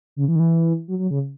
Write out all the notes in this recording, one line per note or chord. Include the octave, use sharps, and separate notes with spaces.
C#3
E3
D#3
E3
F#3
F#3
C#3